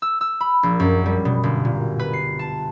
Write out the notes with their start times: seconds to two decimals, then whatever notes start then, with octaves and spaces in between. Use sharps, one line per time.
0.02 E6
0.21 E6
0.40 B5
0.63 A#1
0.80 F#2
1.06 G3
1.25 B2
1.43 G1
1.65 A#2
1.99 B4
2.13 C7
2.39 A5